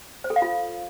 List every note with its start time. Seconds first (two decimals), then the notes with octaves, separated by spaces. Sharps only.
0.24 C5
0.30 A4
0.36 F5
0.42 F4